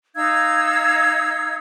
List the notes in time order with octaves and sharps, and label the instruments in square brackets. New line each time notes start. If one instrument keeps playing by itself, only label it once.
[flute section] D#4 F5 E6 G#6